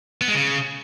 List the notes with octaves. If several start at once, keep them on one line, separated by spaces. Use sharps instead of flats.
B3
G#3
C#3